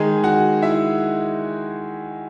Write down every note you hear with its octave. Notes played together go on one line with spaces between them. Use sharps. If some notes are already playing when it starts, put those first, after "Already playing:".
Already playing: D#3 G#3 D#4 G#4 G#5
F#4 F#5
E4 E5